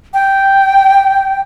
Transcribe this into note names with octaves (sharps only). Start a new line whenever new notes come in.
G5